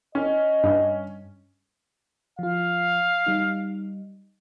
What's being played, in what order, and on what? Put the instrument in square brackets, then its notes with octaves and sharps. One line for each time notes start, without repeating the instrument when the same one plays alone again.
[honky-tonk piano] C#4 [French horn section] D#5
[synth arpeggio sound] G2
[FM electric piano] F3 F4 [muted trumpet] F5
[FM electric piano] G3 D#4